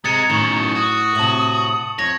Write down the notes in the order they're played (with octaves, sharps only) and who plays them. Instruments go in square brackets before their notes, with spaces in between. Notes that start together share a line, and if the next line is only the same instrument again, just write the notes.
[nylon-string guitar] C3 [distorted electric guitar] G#3 [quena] A#5 [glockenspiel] D#6 A6 C#7
[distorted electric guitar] F#2 D#3 [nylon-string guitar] A2 [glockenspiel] C#6 E7
[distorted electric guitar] F#4 [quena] D#6
[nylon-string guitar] A2 C3 [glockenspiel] A5 F#7
[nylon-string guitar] F2 [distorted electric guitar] C#5 [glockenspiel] A#6